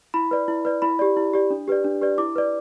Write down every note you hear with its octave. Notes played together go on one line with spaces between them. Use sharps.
E4 B5
B4 D5
E4
B4 D5
E4 B5
G4 D5
E4
G4 D5
D4
G4 B4 D5
D4
G4 B4 D5
E4 D6
B4 D5